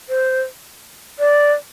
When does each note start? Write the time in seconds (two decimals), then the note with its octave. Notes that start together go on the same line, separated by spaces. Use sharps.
0.09 C5
1.19 D5